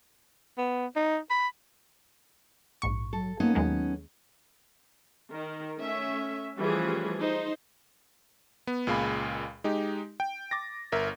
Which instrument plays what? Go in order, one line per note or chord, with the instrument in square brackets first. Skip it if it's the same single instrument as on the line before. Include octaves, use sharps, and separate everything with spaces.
[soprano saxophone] B3
D#4
B5
[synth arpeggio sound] A#1 G#2 C#6
[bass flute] F#3 [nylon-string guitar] A4
[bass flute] A#3 [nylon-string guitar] B3 C#4 D#4
[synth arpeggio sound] D#2 G#3 A#3 [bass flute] F#3
[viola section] D#3 A#4
A3 C#4 E5
E3 F3 G3 A3 C#4 G#4
D#4 C5
[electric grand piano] B3
C#2 A#2 G#3 F5 G#5 B5
G#3 D#4 G4
G5
D6 A6 A#6
G1 A#4 E5